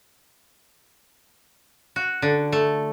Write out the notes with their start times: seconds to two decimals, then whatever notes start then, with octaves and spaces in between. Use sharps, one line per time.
1.96 F#4
2.22 D3
2.52 A3